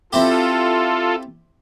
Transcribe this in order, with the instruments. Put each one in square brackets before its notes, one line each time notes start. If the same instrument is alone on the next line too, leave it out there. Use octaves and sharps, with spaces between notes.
[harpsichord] C4 E4 G4 [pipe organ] F4 A4